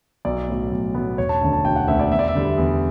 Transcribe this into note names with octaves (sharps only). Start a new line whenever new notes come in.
B1 D5
A2 F#3 B3
B1
A2 F#3 B3
E1 C#5
A5
D2 D3 A5
A5
E1 G5
F#5
D2 D3 E5
D5
E2 E5
D5
E5
D3 G3 B3
E2